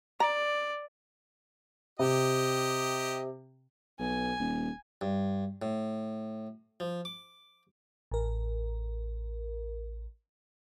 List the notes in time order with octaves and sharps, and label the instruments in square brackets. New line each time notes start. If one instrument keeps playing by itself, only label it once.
[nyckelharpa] D5 [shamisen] A#5
[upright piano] C3 [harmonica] G4 D#5
[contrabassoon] B1 [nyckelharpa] G#5
[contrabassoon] D#1
[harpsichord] G2
A2
F3
D6
[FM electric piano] A1 A#4